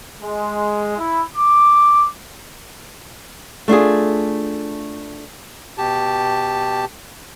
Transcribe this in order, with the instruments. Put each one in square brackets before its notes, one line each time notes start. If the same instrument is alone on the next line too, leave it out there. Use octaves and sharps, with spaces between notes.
[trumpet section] G#3
E4
D6
[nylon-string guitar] A3 D4 F4 G#4
[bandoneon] B2 G4 A5